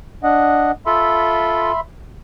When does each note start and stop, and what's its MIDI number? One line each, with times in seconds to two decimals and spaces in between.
0.23 0.71 62
0.23 0.71 75
0.23 0.71 78
0.86 1.72 65
0.86 1.72 69
0.86 1.80 76
0.86 1.80 83
0.86 1.80 84